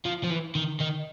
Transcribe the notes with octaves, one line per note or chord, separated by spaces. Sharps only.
F3
F3
E3
D#3
D#3